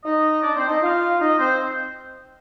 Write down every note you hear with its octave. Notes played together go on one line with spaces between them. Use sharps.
D#4 D#5
D4 D5
C4 C5
D#4 D#5
F4 F5
D#4 D#5
C4 C5